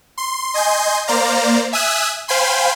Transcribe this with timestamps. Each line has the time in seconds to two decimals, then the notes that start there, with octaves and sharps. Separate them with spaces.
0.18 C6
0.54 D#5 G#5 C6 G6
1.07 A#3 C5 D5 F5 A#5
1.73 E5 G#5 D#6 E6 F#6
2.28 C5 F5 G5 G#5 B5 C6